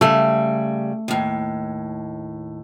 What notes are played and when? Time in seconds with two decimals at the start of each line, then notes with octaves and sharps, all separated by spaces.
0.01 C#3 G3 A3
1.08 D#2 A2